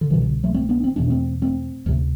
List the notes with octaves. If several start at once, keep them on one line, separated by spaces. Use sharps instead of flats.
D3
C2 B2 E3
D3
F#3 A3
A3 C4
B3 D4
C4
E2 B2 D4
A3 C4
A3 C4
D2 C3